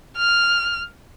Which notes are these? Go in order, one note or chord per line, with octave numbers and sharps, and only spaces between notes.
F6